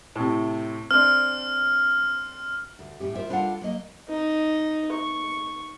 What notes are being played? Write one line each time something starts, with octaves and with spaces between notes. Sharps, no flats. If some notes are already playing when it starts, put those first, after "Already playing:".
A2 C3
C4 D4 F6
D2
A2 C#4 G4
F4 A#4 C5 E5
G3 D4 F4 A4 F5 F#5
F#3 A#3 D#5
D#4
C#6